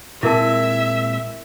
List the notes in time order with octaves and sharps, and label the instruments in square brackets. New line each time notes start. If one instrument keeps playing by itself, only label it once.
[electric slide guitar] A#2 G#3 C4 [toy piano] E4 A#4 A5 [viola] E5